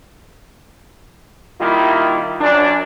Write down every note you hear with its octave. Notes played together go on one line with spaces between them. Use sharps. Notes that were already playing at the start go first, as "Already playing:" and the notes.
D#3 G3 A#3 E4 F4
F#2 D4